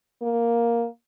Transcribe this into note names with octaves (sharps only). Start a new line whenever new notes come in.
A#3